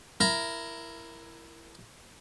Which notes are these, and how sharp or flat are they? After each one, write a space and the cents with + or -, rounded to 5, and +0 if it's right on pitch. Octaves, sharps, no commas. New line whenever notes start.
E4 +15 A#4 +0